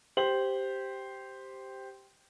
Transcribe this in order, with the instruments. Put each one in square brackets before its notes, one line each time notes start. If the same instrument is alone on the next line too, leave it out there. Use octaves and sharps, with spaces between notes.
[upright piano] G4 C5 F#7